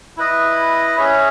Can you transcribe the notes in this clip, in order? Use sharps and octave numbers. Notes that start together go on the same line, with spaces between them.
E4 B4 D#5
C#4 G#4 C#5 E5